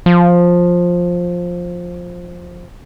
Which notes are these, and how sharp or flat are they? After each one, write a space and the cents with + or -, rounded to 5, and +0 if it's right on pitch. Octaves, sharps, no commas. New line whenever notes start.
F3 +10